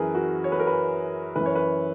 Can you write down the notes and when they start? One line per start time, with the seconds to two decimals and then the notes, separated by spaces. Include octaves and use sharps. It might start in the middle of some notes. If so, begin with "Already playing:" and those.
Already playing: F#2 E3 G#4 A#4 B4
0.15 F#4
0.44 C#5
0.52 B4
0.60 A#4
0.67 B4
1.36 F#2 E3 B4
1.46 C#5
1.55 B4